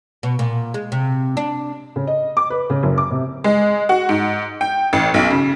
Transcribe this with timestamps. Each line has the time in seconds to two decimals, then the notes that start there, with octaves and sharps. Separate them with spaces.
0.23 B2
0.39 A#2
0.74 G#3
0.92 C3
1.37 D4
1.96 C#3
2.07 D#5
2.37 D6
2.50 B4
2.70 C#3
2.83 F#1
2.98 D6
3.11 C3
3.44 G#3
3.89 F#4
4.09 G#2
4.61 G5
4.93 A1
5.14 B1
5.31 C#3